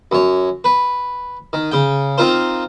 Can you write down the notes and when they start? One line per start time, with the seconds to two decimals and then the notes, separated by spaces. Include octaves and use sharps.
0.12 F#2 C#5
0.64 B4
1.53 D#3
1.71 C#3 G5
2.18 C4 D#4 F4 A#4 C5